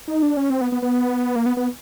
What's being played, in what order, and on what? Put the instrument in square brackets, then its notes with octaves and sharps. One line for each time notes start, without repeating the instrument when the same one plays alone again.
[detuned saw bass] D#4
D4
C#4
C4
B3
B3
B3
A#3
B3
B3